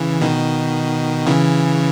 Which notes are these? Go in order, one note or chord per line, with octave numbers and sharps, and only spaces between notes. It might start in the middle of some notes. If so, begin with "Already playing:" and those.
Already playing: C#3 E3
B2 D#3
C#3 E3